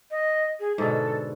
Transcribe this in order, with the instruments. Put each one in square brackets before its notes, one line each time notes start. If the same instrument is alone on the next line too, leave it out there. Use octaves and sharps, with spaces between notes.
[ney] D#5
G#4
[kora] G#2 B2 D3 [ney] A4